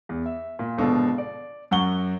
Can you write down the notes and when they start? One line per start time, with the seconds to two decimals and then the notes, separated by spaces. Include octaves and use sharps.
0.09 E2
0.26 E5
0.59 A#2
0.78 G#1 B2 D3 F3 A4 F5
1.18 D5
1.71 F#2 F#3 F#5 C#6 G7